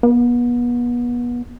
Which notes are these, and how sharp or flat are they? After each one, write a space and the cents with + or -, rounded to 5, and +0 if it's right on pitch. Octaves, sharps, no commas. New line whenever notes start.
B3 -35